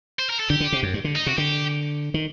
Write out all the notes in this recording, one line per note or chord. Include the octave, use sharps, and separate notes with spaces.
C5
A#4
A4
D3 G4
D3
C3
F#2
G2
D3
D#4
C3 F#4
D3 G4
D#3